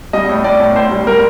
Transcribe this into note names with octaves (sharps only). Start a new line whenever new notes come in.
G3 D#5
A2
A2 D5
A2
A2 C5
G3
G3 A#4